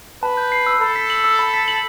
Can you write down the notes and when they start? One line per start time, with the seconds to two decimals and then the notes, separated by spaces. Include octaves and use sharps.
0.23 B4 A5
0.37 G6
0.52 C7
0.67 E6
0.81 A4 B5
0.96 B6
1.10 F#7
1.24 E6
1.39 B5
1.54 B6
1.68 F#7